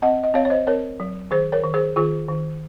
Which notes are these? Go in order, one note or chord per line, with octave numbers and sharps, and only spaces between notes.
C4 D#5 F#5
D#5
C4 C#5 F5
C#5
C5 D#5
C4 A#4 C#5
F#3
D#3 G#4 C5
A#4 C#5
D#3
G#4 C5
D#3 F4 G#4
D#3